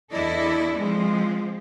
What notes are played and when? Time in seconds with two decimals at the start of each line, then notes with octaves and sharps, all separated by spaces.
0.12 E2 D4 E4 A4 D5 D#5
0.77 F3 G#3 C4